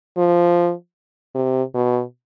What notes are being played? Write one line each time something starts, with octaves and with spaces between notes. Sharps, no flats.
F3
C3
B2